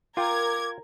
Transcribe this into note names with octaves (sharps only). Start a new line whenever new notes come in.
F4 A#4 G5 D6 G#6